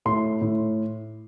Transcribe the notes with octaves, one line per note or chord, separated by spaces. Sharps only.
A2 C6
A2